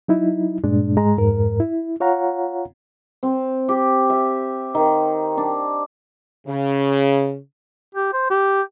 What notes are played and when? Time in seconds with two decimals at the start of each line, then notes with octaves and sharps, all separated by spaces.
0.08 F#3 D#4 E4
0.64 G2 A#2 G#3 D4
0.97 G#2 G#3 A#5
1.17 F2 G#2 A#4
1.60 E4
2.00 F4 C#5 F5 F#5 A#5
3.23 C4
3.68 G4
4.10 E5
4.75 D#3
5.37 D4
6.47 C#3
7.95 G4
8.13 C5
8.30 G4